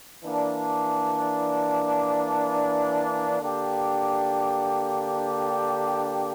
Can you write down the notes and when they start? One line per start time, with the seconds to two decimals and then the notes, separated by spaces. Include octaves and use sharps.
0.24 E3 A#3 D4
3.41 D3 A#3 D4 G4